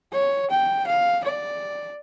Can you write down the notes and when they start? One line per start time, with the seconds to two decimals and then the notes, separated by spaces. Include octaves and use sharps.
0.12 C#5
0.51 G5
0.87 F5
1.24 D5